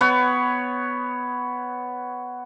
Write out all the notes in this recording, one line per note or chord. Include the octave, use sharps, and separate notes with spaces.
B3 B4 C#5